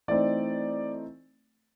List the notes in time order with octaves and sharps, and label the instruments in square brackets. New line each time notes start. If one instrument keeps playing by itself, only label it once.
[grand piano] E3 A3 C4 D#4 D5